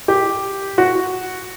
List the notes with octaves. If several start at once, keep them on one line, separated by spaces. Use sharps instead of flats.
G4
F#4